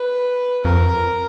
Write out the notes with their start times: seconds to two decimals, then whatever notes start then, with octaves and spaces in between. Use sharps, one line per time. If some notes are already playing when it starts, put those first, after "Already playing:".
Already playing: B4
0.64 F2 A#4